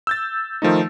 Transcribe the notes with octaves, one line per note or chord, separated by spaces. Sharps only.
E6 G6 A6
D#3 F3 A3 D#4